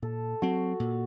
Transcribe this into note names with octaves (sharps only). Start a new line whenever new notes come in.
A#2 A4
F#3 C4 F#4
A#2